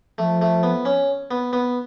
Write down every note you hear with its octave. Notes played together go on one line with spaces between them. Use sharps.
F3 A3
A3
B3
C#4
B3
B3